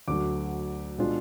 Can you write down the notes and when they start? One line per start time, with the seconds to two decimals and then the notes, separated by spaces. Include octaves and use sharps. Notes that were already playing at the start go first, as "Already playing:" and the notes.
0.08 D2 D3 F#3 D6
0.98 B2 G#3 D4 F4